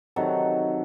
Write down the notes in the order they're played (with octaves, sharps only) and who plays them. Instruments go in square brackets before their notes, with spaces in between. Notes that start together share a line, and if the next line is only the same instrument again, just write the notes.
[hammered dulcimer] C3 D#3 F#3 A4